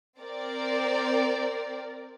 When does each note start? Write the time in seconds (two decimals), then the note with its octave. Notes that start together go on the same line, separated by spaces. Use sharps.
0.21 C4 A#4 D5